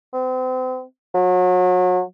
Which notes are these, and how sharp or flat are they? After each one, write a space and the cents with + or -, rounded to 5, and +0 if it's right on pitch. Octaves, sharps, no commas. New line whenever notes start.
C4 -35
F#3 -30